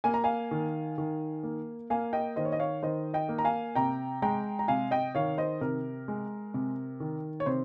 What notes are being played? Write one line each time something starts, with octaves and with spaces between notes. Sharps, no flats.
A#3 G#5
A#5
F5 G#5
D#3
D#3
A#3
A#3 F5 G#5
D#5 G5
D#3 C5 D#5
C#5
D#5
C#5 F5
D#3 C5 D#5
D#5 G5
A#3
A#5
F5 G#5
C3 G5 A#5
G#3 G5 A#5
A#5
C3 F5 G#5
D#5 G5
D#3 C#5 F5
C5 D#5
C3 A#4
G#3
C3
D#3
C#5
C3 C5